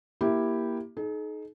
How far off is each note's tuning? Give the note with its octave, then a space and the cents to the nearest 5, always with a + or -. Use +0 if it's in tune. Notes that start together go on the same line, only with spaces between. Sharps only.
A#3 +15 E4 +0 G4 +0
D#4 +0 G#4 +45